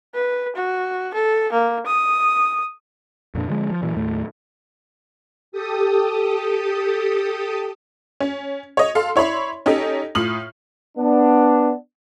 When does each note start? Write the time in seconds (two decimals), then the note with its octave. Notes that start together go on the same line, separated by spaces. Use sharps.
0.14 B4
0.56 F#4
1.14 A4
1.52 A#3
1.86 D#6
3.35 F2 A#2 D4
3.49 D3 F3 G3 G#3
3.70 F3
3.82 A#2 E3 F#3
3.96 D#2 A2 A3
5.52 G4 A4 D#6
8.20 C#4
8.77 C#5 D#5
8.95 A4 F5 C6
9.16 E4 C#5 D5 B5 C6
9.66 C#4 D#4 G4 A4
10.15 A2 F4 D#6 F6 F#7
10.98 B3 D4